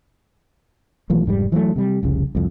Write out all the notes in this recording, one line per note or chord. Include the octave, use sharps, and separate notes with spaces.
B1 E3 F3 A3
F1 G#2 C3 G3
E3 F#3 G3 A3
C3 G3
F1 C2 C#3
C2 F2